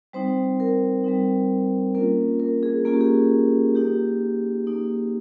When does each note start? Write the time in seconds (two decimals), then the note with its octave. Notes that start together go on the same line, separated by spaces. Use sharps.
0.13 G3 C4 D#4 C5
0.60 A#4
1.04 G3 C4 D#4
1.95 A#3 C#4 F4 A#4
2.40 A#4
2.63 G#4
2.85 A#3 C#4 F4 G#4
2.94 G4
3.01 G#4
3.75 A#3 D#4 G4
4.67 A#3 D#4